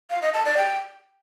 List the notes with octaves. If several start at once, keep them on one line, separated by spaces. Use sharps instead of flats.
F5
D#5
A5
D5
G5